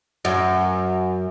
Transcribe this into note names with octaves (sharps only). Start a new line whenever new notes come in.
F#2